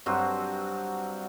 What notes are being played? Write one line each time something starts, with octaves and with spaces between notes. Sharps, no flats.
G2 F#3 C4 F#4